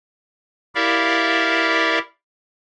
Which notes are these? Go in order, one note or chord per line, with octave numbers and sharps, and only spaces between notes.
E4 G4 A#4 D5 E5 F5